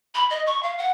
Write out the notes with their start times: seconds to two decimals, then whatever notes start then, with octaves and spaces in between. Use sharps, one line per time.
0.14 B5
0.30 D#5
0.46 C#6
0.63 F5
0.78 F#5